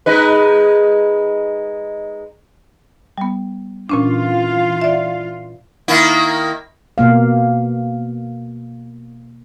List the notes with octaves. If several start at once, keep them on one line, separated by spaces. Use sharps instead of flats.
G#3 D#4 B4
G3 B3
A#2 E3 C#4 D4 F4 F5
D5 E5
D#3 A#3 E4
B2 A#3 F5